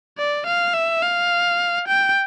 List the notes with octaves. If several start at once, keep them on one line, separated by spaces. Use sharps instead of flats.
D5
F5
E5
F5
G5